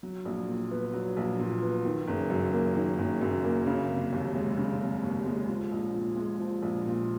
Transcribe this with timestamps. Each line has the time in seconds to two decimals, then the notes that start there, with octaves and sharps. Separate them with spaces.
0.03 F#3
0.25 A#1
0.48 A#2
0.71 B3
0.93 F#3
1.17 A#1
1.39 A#2
1.62 B3
1.85 D#3
2.08 F#1
2.30 F#2
2.53 A#3
2.76 D#3
2.99 F#1
3.21 F#2
3.44 A#3
3.66 C#3
3.89 F1
4.12 D#2
4.35 G#3
4.58 C#3
4.80 F1
5.03 D#2
5.26 G#3
5.48 F3
5.71 A#1
5.94 A#2
6.17 G#3
6.39 F3
6.62 A#1
6.85 A#2